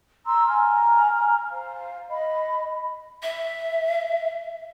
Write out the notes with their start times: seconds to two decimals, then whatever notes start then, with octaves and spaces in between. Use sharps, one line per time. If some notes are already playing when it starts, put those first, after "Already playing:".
0.26 A#5 C6 E6
0.47 G#5 A#5 F6
1.51 C5 F5
2.10 D#5 B5
3.23 E5